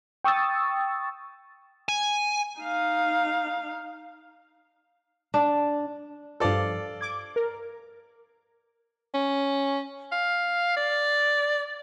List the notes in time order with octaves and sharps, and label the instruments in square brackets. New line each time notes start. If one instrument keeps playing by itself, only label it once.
[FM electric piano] G5 C#6 D#6 E6 A6
[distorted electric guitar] G#5
[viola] D#4 F5
[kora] D4
[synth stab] G2 F3 [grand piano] A4 D5 F5
[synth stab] D6 G#6
A#4
[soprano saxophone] C#4
F5
D5